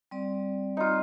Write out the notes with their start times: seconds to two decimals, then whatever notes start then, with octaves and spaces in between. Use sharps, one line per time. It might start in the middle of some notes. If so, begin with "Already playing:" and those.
0.11 G3 C4 D5
0.77 D#4 F4